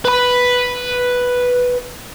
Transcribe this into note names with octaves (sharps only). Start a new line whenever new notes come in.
B4 B5